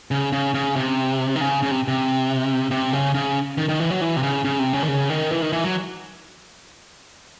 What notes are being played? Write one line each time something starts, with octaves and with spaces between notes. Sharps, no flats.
C#3
C#3
C#3
C3
D#3
C#3
C#3
C3
C3
C3
C#3
C#3
D#3
D#3
E3
F#3
E3
C3
C#3
C#3
C3
C#3
D#3
C#3
D#3
E3
D#3
E3
F#3